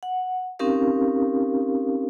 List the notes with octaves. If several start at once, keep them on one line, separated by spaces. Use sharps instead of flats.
F#5
C4 C#4 D#4 G4 A#4 F5